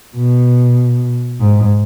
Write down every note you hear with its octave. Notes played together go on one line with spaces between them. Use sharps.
B2
G#2